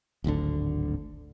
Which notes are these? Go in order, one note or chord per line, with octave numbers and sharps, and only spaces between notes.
D1 G#1 D2 D3